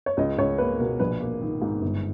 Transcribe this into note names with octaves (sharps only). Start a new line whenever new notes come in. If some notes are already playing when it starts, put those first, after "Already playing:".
C#5
C#2 D#5
C#2 C#5
A#3 B4
B2 A#4
A#1 B4
A#3
D#3
G#2
G1